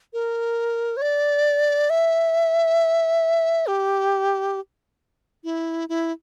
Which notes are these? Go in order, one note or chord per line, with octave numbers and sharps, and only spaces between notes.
A#4
C#5
D5
E5
G4
E4
E4